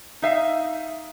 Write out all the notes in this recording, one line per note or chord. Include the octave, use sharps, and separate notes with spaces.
D#4 E5 F5